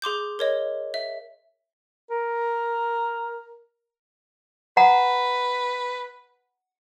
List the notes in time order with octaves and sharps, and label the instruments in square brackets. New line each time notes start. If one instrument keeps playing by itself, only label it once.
[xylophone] G#4 C6 D6 G6
A#4 C#5 D#5
E5
[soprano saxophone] A#4
[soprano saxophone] B4 [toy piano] F#5 A#5